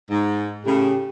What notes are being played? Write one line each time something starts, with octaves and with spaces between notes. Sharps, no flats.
G#2
A2 C#3 G4